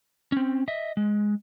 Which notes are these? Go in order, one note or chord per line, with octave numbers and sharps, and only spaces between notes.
C4 C#4
D#5 E5
G#3